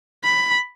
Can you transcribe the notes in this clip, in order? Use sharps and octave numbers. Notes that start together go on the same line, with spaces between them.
B5